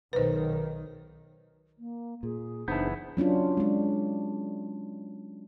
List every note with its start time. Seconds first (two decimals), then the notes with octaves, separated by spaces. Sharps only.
0.13 B1 D#3 B4 C5
1.79 A#3
2.23 A#2 G#4
2.68 F#1 E3 B3 D4 D#4 C5
3.17 F#3 C#4 D4 F4
3.57 G#3 D4